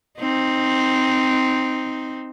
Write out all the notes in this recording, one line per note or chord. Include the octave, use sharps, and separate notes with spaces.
C4 D#4